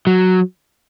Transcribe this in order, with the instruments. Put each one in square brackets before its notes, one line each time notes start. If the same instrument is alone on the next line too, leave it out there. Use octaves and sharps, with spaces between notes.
[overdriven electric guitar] F#3